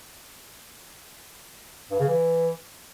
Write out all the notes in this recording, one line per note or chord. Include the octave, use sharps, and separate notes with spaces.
G2
C#3
E3